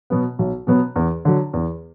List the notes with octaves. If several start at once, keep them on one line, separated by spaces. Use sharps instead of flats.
B2 F#3 B3
B1
B2 F#3 B3
E2
D3 F#3
E2